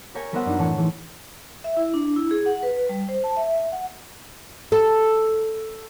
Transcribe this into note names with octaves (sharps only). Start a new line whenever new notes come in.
G4 A#4 C#5 G5 G#5
G3 B3 A#4 C5 E5 F#5
F#2 D4 D#4
A2 E3 A3 C#5 A5
E3 G#3 A3
E5
E4
D4
E4
G#4
F#5
B4
G3
C5
A5
E5
F#5
A4